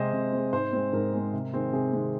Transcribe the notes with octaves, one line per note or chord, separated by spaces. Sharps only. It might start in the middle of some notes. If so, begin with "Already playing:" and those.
Already playing: C3 G#3 C4 C5 D#5
C3
G#3 C4
G#2 C5
G#3 C4
G#2 A#4
G#3 C4
C3
D#3 G#3 C4
C3 G#4
D#3 G#3 C4